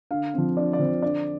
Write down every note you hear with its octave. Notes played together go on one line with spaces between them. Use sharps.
D3 F5
F3 C4
D3 D5
D5
F3 C4 C5
D3 D5